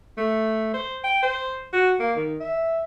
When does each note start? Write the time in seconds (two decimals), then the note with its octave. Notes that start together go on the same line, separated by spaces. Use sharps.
0.18 A3
0.74 C5
1.04 G5
1.22 C5
1.73 F#4
2.00 A#3
2.16 D#3
2.40 E5